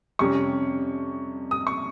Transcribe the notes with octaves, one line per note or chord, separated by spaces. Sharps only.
F2 C3 G3 C#4 C#6
D#6
C#6